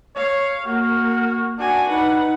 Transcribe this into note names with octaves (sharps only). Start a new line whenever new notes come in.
C#5 F5
A#3 F#4 F6
D4 F#4 F#5 G#5
D#4 B4 F#5